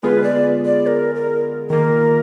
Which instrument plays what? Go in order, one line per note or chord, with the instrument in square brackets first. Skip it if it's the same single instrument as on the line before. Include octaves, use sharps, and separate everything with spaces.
[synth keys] D3 G#3 B3 F4 G#4 [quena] B4
[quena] D5
D5
A#4
A#4
[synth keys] D#3 A#3 F4 [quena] A#4